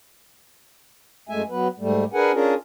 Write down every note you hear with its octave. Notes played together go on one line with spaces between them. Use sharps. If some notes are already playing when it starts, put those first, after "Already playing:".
F#2 G#3 A3 E5 G#5
F#3 B3 B4
G#2 G3 A3
D4 G#4 A#4 B4 F#5 G#5
C#4 D4 F4 G#4 A#4